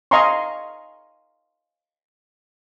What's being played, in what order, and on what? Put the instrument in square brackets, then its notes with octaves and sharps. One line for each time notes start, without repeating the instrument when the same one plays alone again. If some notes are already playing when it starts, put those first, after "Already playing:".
[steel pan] D#5 F5 G#5 A#5 C6 C#6